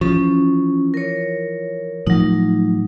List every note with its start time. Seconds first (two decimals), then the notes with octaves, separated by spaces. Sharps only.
0.01 E3 F3 C#4
0.94 A#4 C#5
2.07 A2 F3 F#3 D#4